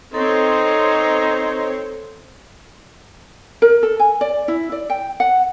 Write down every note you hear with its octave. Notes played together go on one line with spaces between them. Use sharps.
C4 D#4 A4 C5 C#5
A#4
A4
G#5
D5
E4
D5
G5
F#5